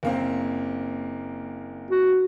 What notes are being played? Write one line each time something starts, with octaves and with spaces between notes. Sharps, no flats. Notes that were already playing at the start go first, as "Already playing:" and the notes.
F#1 A#3 C4
F#4